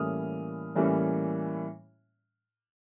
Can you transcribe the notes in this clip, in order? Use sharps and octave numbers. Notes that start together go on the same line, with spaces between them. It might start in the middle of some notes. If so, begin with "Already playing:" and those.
Already playing: A2 E3 G3 A#3 C#4 D#6 F6
A2 E3 G3 A#3 C#4